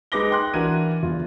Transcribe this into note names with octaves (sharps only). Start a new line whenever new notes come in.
G#3 D#4 B4 D6 A#6 G7
G5 C6 F#6
E3 D4 F#4 A#4 G#6 D#7
E2 F4